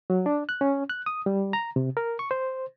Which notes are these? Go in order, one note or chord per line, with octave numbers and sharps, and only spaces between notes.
F#3
D4
F#6
C#4
F#6
D#6
G3
A#5
C3
A#4
C#6
C5